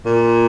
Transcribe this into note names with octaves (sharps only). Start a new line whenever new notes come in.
A#2